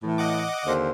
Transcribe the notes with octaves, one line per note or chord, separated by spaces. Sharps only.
A2 E3
D#5 F#5 D6
D#2 D3 C5